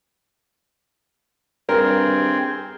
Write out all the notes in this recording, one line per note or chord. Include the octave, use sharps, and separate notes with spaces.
G2 C4 G#4 A#4 G5